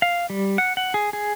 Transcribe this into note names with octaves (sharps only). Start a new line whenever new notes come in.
F5
G3
F#5
F#5
G#4
G#4